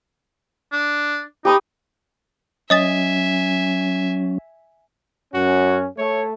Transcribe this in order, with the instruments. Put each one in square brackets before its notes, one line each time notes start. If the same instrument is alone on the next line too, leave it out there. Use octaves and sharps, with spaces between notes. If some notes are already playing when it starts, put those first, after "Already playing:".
[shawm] D4
[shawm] D#4 [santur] G4 B5 D#6
[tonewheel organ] F#3 C#4 [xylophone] D#5 D#6 A6 [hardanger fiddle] E5 G#5
[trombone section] F#2 C#4 [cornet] F#4
[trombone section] A3 [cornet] C#5